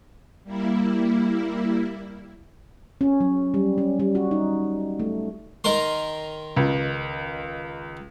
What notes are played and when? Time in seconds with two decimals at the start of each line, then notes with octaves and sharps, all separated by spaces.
0.44 G3 A#3 E4
3.01 C#4
3.20 F#3
3.54 G3
3.78 C#4
4.00 G3
4.15 F#4
4.31 D#4
4.99 A3
5.64 D#3 A#4 C6
6.56 C#2